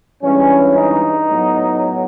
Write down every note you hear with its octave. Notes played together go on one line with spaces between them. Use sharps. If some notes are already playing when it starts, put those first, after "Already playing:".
G2 E3 G#3 C#4
D#4
A2 F#3 B3